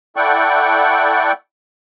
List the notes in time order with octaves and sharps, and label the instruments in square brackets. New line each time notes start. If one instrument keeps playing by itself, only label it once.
[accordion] E4 A4 D5 F#5 G5 C#6